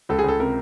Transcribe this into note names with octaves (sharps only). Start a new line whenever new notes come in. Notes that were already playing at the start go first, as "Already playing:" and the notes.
C#2 A4
G#4
C#2 A4
C3 A#4